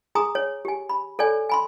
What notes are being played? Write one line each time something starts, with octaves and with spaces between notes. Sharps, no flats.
G#4 G#5 A#5 C6 D#6
C#5
G4 G#5
B5
A4 C#5 D5 G#5
G#5 B5 C6